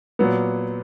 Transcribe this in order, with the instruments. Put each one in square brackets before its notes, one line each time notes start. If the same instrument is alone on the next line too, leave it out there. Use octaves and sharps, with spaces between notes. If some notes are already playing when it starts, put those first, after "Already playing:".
[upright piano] A#2 F#3 B3